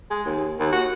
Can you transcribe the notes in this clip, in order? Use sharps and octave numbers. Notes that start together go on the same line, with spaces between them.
G#3
D#2
D#2
F#4